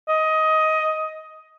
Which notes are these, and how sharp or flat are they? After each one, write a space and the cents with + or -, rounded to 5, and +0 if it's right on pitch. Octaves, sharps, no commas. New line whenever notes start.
D#5 +15